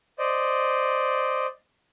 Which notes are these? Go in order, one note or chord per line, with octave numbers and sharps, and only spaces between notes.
C5 D5 D#5